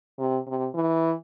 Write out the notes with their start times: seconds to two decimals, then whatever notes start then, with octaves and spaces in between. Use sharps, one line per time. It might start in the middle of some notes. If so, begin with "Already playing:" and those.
0.18 C3
0.47 C3
0.75 E3